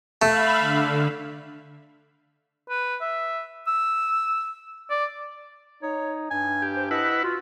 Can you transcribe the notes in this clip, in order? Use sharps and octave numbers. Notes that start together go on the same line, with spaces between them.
A3 E5 F5 B5
D3
B4
E5
E6
D5
D#4 C#5
G2 G#5
G4
C5
E4 B4 D#5 F#5
F4 F#4